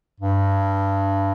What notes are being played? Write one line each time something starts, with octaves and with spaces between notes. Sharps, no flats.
G2